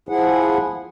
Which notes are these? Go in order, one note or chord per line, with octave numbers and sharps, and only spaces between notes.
F3 E4 G#4 F#5